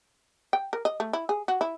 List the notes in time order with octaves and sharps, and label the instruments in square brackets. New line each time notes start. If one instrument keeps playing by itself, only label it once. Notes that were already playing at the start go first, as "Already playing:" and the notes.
[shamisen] G5
A#4
D#5
A3
E4
G#4
F#4
E4